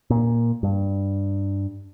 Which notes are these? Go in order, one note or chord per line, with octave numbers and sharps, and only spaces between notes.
A#2
G2